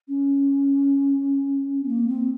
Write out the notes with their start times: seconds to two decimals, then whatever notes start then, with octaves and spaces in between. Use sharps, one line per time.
0.09 C#4
1.83 C4
1.88 A#3
2.08 C4